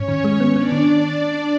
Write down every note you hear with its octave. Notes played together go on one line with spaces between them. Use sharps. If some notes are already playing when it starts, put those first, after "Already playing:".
Already playing: G#2 C#4 C#5
D#3
G#3
B3
B3 D4 D5
D#3